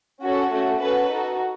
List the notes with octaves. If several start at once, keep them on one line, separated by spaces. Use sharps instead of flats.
C#4 F#4 A4
A3 C#4 F#4
C#4 F#4 A4 B4
D#4 F#4 A4